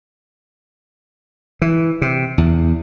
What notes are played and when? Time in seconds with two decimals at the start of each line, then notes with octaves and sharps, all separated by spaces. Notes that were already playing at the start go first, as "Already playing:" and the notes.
1.62 E3
2.02 C3
2.38 E2